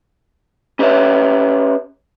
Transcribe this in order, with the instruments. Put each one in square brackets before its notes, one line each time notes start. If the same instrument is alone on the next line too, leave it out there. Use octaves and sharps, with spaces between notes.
[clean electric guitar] C#4 G4 B4 C#5 E5